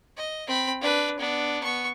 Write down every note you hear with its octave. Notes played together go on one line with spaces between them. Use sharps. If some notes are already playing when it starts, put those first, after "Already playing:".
D#5
C4 B5
D4 B4
B3 D4
B3 C#6